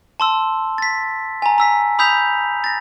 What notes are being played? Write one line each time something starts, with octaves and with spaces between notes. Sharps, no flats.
A5 C6 E6
A6 B6
G#5 A#5
A#5 E6 B6
B5 D#6 E6 G6 B6 F7
A6 A#6